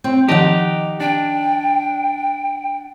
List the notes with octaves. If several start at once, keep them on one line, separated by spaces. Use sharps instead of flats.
C4
D#3 F3 D#4 G4 D#5 F#5 A5
D4 G5